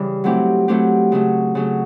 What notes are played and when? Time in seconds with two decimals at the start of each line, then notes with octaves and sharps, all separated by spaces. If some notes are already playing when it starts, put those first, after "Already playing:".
Already playing: C#3 E3 G3
0.24 F#3 A3 C4 E4 G4
0.68 F#3 A3 C4 E4 G4
1.12 C#3 F#3 A3
1.55 C#3 F#3 A3